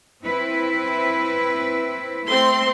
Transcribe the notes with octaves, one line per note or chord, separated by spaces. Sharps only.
C4 E4 B4
A3 C4 C6